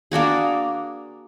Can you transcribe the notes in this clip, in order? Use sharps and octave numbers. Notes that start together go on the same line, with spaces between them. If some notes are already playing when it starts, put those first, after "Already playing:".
A#3 D4 F#4 G#4